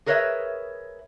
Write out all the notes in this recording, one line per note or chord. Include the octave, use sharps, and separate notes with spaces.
G#4 A#4 B4 C#5 D#5 E5